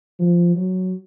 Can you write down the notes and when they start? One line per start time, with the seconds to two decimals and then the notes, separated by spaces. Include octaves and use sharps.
0.19 F3
0.56 F#3